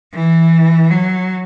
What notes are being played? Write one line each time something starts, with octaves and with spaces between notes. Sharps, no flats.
E3
F#3